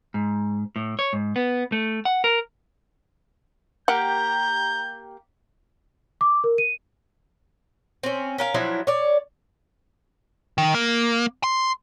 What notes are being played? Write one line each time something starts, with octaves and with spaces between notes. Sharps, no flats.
G#2
A2
C#5
G#2
B3
A3
F#5
A#4
A#3 G4 F#5 A#5 G6
D6
A#4
D#7
C4 C#4
C#4 A#4 F5
F3 F#3 D4 E4
C#5 D5
D#3
A#3
C6